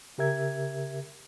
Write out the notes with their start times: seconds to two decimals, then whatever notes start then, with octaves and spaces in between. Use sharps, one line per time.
0.18 C#3 G4 A#4 E5 G#6